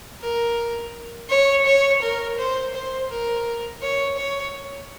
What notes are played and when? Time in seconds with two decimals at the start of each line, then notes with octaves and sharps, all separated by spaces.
0.21 A#4
1.29 C#5
1.66 C#5
2.02 A#4
2.37 C5
2.74 C5
3.10 A#4
3.81 C#5
4.17 C#5